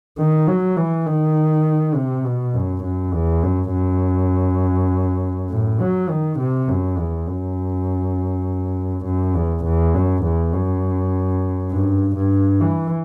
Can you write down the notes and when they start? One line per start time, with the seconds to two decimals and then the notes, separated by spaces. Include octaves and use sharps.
0.18 D#3
0.47 F#3
0.77 E3
1.06 D#3
1.95 C3
2.25 B2
2.54 F#2
2.84 F#2
3.14 E2
3.43 F#2
3.73 F#2
5.50 A2
5.80 F#3
6.10 D#3
6.39 C3
6.68 F#2
6.98 E2
7.28 F#2
9.05 F#2
9.35 E2
9.64 E2
9.94 F#2
10.24 E2
10.53 F#2
11.71 G2
12.16 G2
12.60 E3